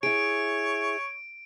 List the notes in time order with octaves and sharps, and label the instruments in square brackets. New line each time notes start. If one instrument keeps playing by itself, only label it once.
[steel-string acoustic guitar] E4 G#4 [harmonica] C#5 [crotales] D7